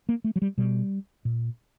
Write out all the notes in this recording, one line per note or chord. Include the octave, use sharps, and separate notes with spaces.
A#3
A3
F#3
G3
B2 G3
A#2